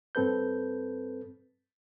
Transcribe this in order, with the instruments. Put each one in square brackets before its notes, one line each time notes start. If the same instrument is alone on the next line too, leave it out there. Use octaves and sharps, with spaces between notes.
[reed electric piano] G2 C4 A4 B4 G6